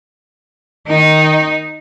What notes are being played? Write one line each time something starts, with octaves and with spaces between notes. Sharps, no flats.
D#3 D#4